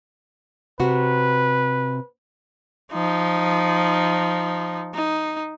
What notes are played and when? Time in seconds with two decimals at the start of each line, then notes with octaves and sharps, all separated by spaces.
0.80 C3 F#4 B4
2.93 F3 D#4
4.94 D#4